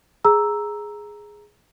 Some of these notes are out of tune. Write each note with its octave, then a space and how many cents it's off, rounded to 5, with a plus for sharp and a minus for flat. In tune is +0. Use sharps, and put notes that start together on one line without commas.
G#4 +0 A#5 +0 E6 +0